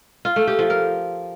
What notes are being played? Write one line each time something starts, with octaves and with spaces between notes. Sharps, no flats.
F4
A3
G4
F3
A#4